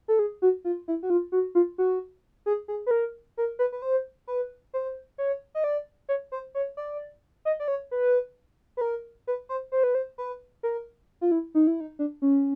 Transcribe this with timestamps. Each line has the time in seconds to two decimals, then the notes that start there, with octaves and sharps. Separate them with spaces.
0.08 A4
0.19 G#4
0.42 F#4
0.64 F4
0.88 E4
1.03 F#4
1.10 F4
1.32 F#4
1.55 F4
1.78 F#4
2.46 G#4
2.68 G#4
2.86 B4
2.91 A#4
3.37 A#4
3.59 B4
3.72 B4
3.82 C5
4.27 B4
4.74 C5
5.18 C#5
5.55 D#5
5.64 D5
6.09 C#5
6.32 C5
6.55 C#5
6.77 D5
7.45 D#5
7.60 D5
7.68 C#5
7.91 B4
8.77 B4
8.81 A#4
9.27 B4
9.49 C5
9.72 C5
9.84 B4
9.95 C5
10.18 B4
10.63 A#4
11.21 F4
11.32 E4
11.55 D#4
11.67 E4
11.80 D#4
11.99 D4
12.22 C#4